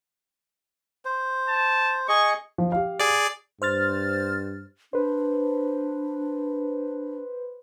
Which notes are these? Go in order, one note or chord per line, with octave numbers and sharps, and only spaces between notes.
C5
A5
G#4 D#5 C#6
F3
G4 F5
G#4 D5
G2 C5 F6 A6
D4 B4 C5